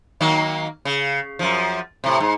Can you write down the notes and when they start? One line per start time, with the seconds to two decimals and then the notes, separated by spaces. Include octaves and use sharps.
0.21 D#3 F#3 A#3
0.85 C#3
1.39 F#2 F3
2.04 A2 C3
2.20 G#2